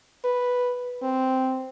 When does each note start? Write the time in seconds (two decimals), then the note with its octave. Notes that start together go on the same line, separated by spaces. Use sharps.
0.24 B4
1.03 C4